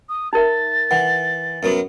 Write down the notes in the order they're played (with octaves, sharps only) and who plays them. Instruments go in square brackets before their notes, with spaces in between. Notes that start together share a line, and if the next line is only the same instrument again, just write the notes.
[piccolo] D#6
[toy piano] D#4 A#4 E5 [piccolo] A6
[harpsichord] E3 [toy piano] F#5
[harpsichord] F#2 F#3 B3